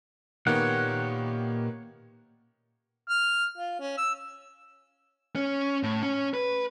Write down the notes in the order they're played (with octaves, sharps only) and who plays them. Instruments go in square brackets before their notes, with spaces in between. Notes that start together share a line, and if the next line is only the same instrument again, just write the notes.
[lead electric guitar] A#2 G4 [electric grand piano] D#3 A#3 B3 [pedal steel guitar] C#5 F#5
[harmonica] F6
F4
C#4
E6
[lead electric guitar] C#4
A2
C#4
B4